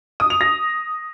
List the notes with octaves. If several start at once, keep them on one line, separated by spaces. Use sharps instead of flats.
D#6
F7
A#6